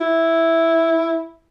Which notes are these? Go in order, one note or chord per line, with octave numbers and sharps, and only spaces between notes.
E4